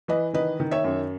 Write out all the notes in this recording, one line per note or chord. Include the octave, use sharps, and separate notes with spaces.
E3 B4 D#5
D#3 B4 D#5
D#3
C#5 E5
F#2